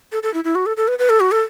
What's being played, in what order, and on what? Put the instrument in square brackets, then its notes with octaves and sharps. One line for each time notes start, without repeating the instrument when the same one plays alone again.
[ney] A4
A4
E4
E4
F#4
A4
A4
B4
B4
A4
F#4
A4